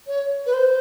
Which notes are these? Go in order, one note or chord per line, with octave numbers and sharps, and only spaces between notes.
C#5
B4
C5